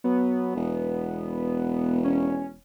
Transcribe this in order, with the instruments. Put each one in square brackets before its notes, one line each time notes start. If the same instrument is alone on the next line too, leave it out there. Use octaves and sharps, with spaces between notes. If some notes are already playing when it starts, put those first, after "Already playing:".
[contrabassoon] F#3 [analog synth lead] B3
[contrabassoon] E1
[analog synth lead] C#4